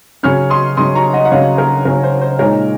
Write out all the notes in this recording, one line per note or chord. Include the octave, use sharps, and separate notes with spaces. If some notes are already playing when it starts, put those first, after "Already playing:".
C#3 F#3 C#4 C#6 F6
C6 D#6
C#3 F#3 C#4 C6 D#6
A#5 C#6
D#5 F#5
F#5
C#3 F#3 C#4 C#5 F5
A#4
C#3 F#3 C#4 A#4
C5
C5
A#2 G#3 D#4 A#4 C#5